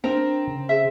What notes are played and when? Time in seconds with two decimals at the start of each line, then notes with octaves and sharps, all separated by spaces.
0.04 C4 D4 A#4
0.47 C#3
0.69 G#4 E5